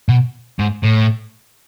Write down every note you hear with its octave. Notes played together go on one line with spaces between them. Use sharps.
B2
G#2
A2